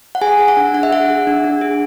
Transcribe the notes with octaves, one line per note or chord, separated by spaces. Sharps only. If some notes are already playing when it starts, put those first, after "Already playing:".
F#5
G#4 G#5
G#4
F#5
D4
D4 F#5
E5
G#4 F#5
G#4
D4
D4
G#4